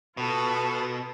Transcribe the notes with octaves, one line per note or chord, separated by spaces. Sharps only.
B2 F4 A4 B4